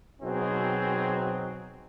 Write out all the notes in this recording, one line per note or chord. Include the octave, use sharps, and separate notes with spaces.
B2 F#3 C4 D#4 G#4